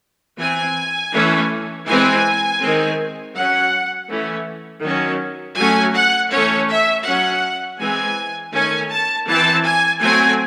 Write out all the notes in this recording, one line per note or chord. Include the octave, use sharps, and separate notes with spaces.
E3 C4 G#5
E3 A3 C#4
E3 G#3 C4 G#5
D#3 G#3 C4
F#3 C#4 F#5
E3 A3 C#4
D#3 F#3 C#4
F#3 A3 C#4 G#5
F#5
E3 A3 C#4 C#5
E5
F#3 C#4 F#5
E3 G#3 C4 G#5
D#3 A3 C#4 G#5
A5
E3 C4 A5
G#5
F#3 A3 C4 G#5